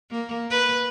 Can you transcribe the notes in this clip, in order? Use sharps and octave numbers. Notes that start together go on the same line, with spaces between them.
A#3
B4